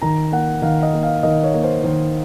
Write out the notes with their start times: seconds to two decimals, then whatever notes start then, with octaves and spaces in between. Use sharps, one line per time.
0.02 D#3 A#5
0.32 A#3 F#5
0.62 D#3 F5
0.83 D#5
0.93 A#3
1.03 F5
1.23 D#3 D#5
1.44 C#5
1.54 A#3
1.64 C5
1.84 D#3 C5